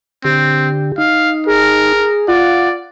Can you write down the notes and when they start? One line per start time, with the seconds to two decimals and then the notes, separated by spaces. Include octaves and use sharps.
0.25 D3 C4 G4
0.98 D#4 F5
1.46 G#4 A#4
2.28 F4 D5 F#5